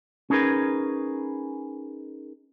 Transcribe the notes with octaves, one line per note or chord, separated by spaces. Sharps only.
C#4 D#4 G#4 A#4 B4